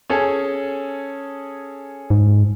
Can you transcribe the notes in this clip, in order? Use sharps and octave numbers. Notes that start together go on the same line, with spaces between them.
C#4 G#4 A4
G#2